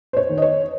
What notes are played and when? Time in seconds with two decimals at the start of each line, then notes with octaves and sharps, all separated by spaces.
0.13 C5
0.17 C#5
0.29 D#3
0.38 D#5
0.42 C#5